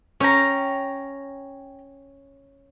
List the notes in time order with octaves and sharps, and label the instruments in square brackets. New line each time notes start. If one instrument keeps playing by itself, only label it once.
[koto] C#4 [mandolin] C#5 G5 A#5